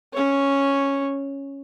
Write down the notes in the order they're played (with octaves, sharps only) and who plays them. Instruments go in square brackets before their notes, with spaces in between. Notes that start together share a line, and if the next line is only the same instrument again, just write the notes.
[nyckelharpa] C#4 C#5